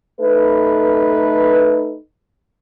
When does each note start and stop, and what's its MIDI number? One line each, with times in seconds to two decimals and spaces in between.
0.19 1.96 57
0.19 1.96 63
0.19 1.96 69
0.19 1.96 71